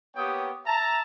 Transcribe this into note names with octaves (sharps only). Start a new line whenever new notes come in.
A#3 B3 G4 C#5 G5 D#6
E5 A5 A#5